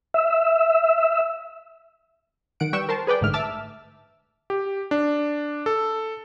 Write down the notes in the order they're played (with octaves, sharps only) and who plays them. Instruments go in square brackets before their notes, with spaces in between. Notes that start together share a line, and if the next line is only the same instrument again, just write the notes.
[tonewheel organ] E5
[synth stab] D#3 F#5 D7
G3 B4 G5 C#6 E6 E7
A#4 C5 A5
G#4 B4 D5 G5
A1 G#2 D3 A3 F6
E5 A5 D6 E6 F6
[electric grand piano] G4
D4
A4